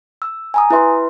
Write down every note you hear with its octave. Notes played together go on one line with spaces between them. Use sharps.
E6
G#5 A#5 D#6
E4 G4 B4 E5 C6